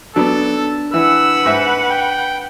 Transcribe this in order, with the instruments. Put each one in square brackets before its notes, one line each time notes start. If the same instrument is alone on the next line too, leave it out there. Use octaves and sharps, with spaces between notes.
[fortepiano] F#3 B3 [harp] D4 [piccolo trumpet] A4
[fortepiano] E3 [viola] B4 F#5 [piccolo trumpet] E6
[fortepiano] G#2 E5
[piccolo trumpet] G5